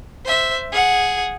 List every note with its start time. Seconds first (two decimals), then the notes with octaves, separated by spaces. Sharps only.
0.25 C5 E5
0.72 G#4 F#5